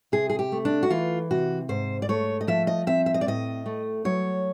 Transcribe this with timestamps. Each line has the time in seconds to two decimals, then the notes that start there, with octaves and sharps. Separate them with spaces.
0.12 C3 G#4
0.30 G#4
0.39 G4
0.52 A3
0.65 D4
0.83 F#4
0.90 E3 F4
1.30 C3 F#4
1.69 G#2 C5
2.02 D5
2.09 A3 C#5
2.41 D#5
2.47 F3 E5
2.67 D#5
2.87 C4 E5
3.06 E5
3.14 D#5
3.21 D5
3.26 A2 D#5
3.66 A3
4.05 F#3 C#5